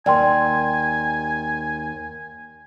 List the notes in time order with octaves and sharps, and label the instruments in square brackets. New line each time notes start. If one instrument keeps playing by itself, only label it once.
[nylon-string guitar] D#2 [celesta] D5 G5 C6 [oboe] G#5